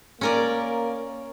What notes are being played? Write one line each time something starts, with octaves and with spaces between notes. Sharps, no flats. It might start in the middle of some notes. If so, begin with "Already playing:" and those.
A#3 C#4 A#4 D5